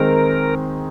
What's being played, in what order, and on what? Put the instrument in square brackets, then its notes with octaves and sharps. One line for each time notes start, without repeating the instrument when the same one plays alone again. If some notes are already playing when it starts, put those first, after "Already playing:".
Already playing: [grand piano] D#3 G#3 C4 D#4 [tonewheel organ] A#4